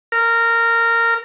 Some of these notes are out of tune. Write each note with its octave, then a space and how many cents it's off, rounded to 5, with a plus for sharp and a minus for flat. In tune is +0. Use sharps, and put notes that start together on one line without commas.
A#4 -15